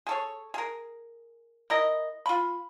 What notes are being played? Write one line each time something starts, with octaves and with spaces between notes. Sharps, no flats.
G#4 A4 C#5
G#4 A#4
E4 A#4 D#5
F4 B5